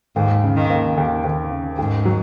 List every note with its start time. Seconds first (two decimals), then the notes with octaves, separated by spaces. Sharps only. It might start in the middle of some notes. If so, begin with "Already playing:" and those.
0.16 D#2 G#2
0.43 C#3
0.56 D#3
0.70 A#3
0.97 D#2
1.24 D#2
1.51 C#3
1.78 G#2 D#3
2.05 F#3